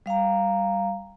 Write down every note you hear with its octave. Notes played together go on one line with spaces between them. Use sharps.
G3 F5 G5 A#5